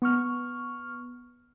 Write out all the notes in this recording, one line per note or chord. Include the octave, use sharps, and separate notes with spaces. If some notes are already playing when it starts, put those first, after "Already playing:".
B3 C#6 F6